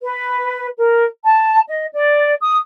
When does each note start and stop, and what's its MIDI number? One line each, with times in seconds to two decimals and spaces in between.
0.02 0.67 71
0.77 1.05 70
1.24 1.59 81
1.67 1.85 75
1.92 2.33 74
2.41 2.55 87